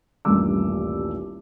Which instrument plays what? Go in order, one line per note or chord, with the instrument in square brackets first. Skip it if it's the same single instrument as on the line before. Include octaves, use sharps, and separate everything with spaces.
[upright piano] D#1 A1 G2 C#4 D6 E6